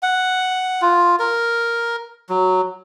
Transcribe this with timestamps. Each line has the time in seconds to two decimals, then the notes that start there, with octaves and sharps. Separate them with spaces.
0.03 F#5
0.82 F4
1.19 A#4
2.29 F#3